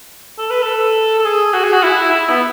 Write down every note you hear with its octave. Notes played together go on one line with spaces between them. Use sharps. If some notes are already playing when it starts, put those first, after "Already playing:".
A4
B4
A4
A4
G#4
F#4
G#4
F#4
E4
E4
B3